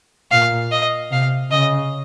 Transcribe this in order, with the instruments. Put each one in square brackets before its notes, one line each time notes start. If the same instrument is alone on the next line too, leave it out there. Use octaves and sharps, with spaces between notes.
[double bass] A#2 [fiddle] F5
[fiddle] D#5
[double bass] C3 [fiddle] F5
[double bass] C#3 [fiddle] D#5